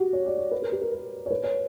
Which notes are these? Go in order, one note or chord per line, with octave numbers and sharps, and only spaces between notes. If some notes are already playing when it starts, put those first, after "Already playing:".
Already playing: F#4 G4
C#5
D5
C#5
B4
A#4
G4
A#4
B4
C#5
B4
C#5